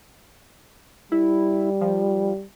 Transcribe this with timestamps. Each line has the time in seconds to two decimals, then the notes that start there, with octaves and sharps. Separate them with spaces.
1.12 G3 E4
1.81 F3